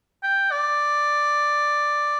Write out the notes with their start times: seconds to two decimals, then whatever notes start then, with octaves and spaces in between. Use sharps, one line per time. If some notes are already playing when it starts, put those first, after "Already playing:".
0.23 G5
0.52 D5